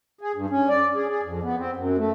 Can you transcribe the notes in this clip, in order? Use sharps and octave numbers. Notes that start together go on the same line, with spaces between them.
G#4
G2
C#4
D5
G#4
G#4
F2
B3
C4
F#2
A3